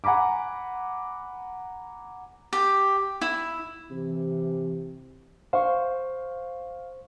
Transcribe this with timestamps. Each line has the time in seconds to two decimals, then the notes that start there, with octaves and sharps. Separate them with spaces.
0.04 F#5 G#5 A#5 B5 D6
2.53 G4
3.21 E4
3.91 C3 E3
5.53 C5 F5 C#6